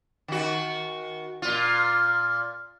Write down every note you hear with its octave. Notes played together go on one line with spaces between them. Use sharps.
D#3 F#4
A#2 F4